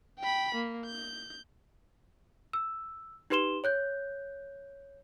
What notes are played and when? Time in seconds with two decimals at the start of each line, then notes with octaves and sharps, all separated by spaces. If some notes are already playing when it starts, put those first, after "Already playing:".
0.20 G5 B5
0.55 A#3
0.86 G6
2.53 E6
3.30 D#4 G4 B4 C6 E7 G7
3.64 C#5 F#6 G6